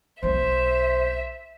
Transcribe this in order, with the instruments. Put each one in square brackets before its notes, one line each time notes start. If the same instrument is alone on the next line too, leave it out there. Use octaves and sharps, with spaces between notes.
[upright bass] B1 F4 [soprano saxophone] C5 [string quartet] E5